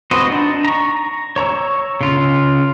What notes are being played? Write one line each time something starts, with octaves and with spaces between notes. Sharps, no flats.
C4 F#4 B4 C5 D#5
D4 D#4
A#5 C#6
C#5 A#5 C#6 E6
C#3 F4